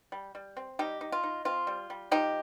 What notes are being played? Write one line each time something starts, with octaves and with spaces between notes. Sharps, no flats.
G3
G3
C4
G3 D#4 G4
D#4
F4
D#4
C4 F4
G3
G3
F3 D#4 G4